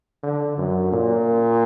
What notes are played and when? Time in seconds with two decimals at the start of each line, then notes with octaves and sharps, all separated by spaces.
0.23 D3
0.58 F#2
0.93 A#2